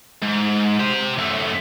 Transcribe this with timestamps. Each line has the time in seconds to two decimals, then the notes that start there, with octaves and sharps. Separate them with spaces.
0.22 G#2
0.79 G4 C5
1.18 F#2 A3